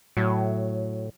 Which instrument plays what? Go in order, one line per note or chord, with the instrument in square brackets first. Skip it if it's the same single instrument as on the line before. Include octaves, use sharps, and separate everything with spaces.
[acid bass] A2 [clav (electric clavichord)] F#3